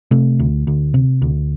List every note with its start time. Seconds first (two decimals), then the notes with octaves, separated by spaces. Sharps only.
0.11 C3 A3
0.39 D2
0.67 D2
0.94 C3
1.22 D2